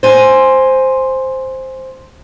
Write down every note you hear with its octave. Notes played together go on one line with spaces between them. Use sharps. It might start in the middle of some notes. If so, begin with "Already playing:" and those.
C5 G#5